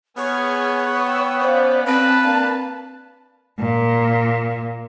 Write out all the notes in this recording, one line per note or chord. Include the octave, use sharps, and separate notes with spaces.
B3 G#4 C#5 F6 G#6
F#5 G5 E6
C#4 C5 D5 F5
C4 B4 A5
A#3 D4 F5
A#2